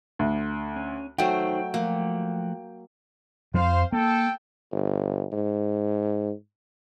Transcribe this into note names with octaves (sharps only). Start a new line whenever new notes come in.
D2
C#4
F#3 A3 D#4 F#4 C5 G5
F3 A3 A#3 F#4
F2 F3 C5 F5
A#3 A4 G5
G1
G#2